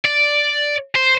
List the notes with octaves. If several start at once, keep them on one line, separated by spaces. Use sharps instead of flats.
D5
C5